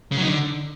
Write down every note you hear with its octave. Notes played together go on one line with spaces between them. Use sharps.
C#3
F#3
D#4
D3